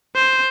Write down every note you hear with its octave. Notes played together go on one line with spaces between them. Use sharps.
C5